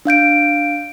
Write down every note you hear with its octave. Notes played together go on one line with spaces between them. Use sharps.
D4 F5 G6 D7